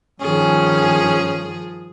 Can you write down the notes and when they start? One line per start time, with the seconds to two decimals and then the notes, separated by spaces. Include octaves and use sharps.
0.21 G2 D#3 F3 C#4 G#4